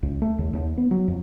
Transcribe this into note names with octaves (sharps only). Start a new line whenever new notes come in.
C#2
A3
D#2
D#2
B3
F#3
F2